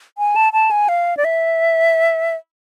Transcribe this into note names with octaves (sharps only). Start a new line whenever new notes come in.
G#5
A5
A5
G#5
F5
D5
E5